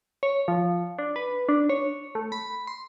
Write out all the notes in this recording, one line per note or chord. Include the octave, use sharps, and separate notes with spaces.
C#5
F3
D4
B4
D4
C#5
A3
B5
C6